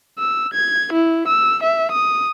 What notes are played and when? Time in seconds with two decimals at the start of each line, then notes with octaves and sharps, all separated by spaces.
0.19 E6
0.54 G#6
0.93 E4
1.28 E6
1.63 E5
1.92 D#6